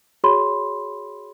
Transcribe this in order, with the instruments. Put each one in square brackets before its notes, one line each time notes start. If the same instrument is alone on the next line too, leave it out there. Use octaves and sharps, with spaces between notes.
[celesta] F#4 G#4 C#5 B5 C6